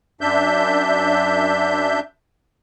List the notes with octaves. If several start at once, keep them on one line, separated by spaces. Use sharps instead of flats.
F#2 D4 E5 G6